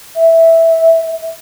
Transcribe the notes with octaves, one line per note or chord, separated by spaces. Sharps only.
E5